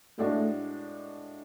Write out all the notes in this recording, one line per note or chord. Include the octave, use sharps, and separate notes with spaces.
A2 G#3 A3 D4 F#4